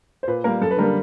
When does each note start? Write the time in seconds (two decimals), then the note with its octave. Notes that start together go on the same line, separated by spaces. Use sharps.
0.23 C5
0.28 A#2 B4
0.44 G3 A#3 A#4
0.61 F#2 A4
0.71 B4
0.77 D3 G3 A#3 A#4